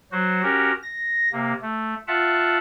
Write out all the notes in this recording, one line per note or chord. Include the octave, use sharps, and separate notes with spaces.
F#3 F#4 C5
C#4 F#4 G4 A#4
A#6
C3 A#3
A3
F4 E5 F#5 A5